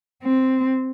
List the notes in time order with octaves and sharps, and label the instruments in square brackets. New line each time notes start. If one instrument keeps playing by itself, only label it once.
[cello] C4